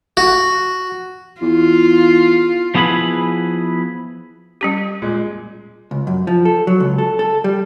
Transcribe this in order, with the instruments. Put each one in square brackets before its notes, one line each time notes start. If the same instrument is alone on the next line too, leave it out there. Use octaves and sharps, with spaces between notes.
[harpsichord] F#4
[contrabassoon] E2 [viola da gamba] F4
[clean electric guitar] F3 B3 E4 G#4 B4 B5
[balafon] G3 C#4 G4
[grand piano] A#2 G#3
[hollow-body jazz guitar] C#2
F#2
F3
A4
F#3
C#2
A4
A4
G3